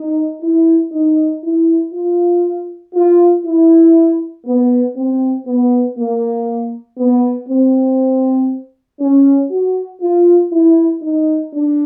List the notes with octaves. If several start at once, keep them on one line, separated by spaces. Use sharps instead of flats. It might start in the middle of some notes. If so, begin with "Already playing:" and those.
Already playing: D#4
E4
D#4
E4
F4
F4
E4
B3
C4
B3
A#3
B3
C4
C#4
F#4
F4
E4
D#4
D4